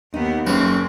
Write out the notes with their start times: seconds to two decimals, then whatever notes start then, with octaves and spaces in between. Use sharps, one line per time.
0.14 D#2 B3 D#4
0.47 F#1 C4 C#4 B4